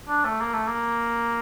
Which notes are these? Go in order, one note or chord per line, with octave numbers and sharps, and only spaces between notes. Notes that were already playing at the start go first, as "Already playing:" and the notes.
D4
A3
A#3
A3
A#3